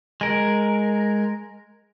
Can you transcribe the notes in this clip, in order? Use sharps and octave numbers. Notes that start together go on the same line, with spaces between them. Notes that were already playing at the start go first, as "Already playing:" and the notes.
G#3 A#4